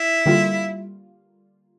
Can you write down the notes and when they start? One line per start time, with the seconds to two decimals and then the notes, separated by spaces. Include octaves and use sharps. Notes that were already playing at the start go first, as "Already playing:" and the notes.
Already playing: E4
0.26 D3 G3 A#3 F4